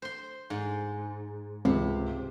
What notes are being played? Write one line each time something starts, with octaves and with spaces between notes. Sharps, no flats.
C5 C6
G#2
C#2 C3